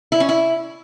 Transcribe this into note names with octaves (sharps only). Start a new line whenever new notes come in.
E4
C#4
E4